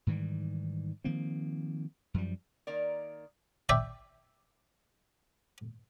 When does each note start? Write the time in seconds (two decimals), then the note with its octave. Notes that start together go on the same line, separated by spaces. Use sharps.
0.07 G#2 D#3 E3 G3
1.04 D#3 F3 A#3 C4
2.14 F#2 F3 G3
2.67 D#3 A#3 A#4 D5
3.69 D5 E5 G5